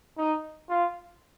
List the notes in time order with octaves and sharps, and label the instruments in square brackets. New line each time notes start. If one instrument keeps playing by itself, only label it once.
[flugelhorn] D#4
F4